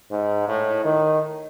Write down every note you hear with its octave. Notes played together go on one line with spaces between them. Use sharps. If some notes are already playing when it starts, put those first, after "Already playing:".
G#2
A2
D#3